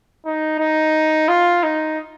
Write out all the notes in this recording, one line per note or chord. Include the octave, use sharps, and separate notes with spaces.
D#4
D#4
F4
D#4